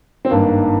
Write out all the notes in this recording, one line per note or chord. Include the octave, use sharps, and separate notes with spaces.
C4
G#1 G2 D#3 A#3